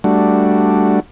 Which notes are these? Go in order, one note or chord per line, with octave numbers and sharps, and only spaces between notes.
G3 A3 D4 F#4